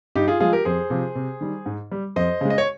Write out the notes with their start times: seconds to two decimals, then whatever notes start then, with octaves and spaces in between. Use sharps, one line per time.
0.15 G2 D#4 G4
0.28 F4 G#4
0.40 F3 G#3 F4 G#4
0.53 G4 A#4
0.65 F2 G#4 C5
0.90 C3 F3
1.15 C3
1.41 D#3 G3
1.66 G#2
1.92 G3
2.16 F2 C5 D#5
2.41 C#3 G#3
2.50 D#5
2.58 C#5